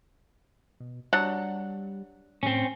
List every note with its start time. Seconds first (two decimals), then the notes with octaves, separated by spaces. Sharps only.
0.80 B2
1.13 F#3 G3 D4 F#5
2.43 A2 C4 C#4